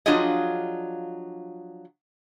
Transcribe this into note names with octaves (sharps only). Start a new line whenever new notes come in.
F3 F#3 D4 F4 G#4 D#5